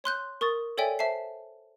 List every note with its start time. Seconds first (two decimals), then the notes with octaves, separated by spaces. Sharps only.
0.04 C#5 C6 F#6 G6
0.41 A#4 C#6 D#6 A6
0.78 A4 C#5 D5 E5 G5 G#5
0.99 C5 E5 A5 C7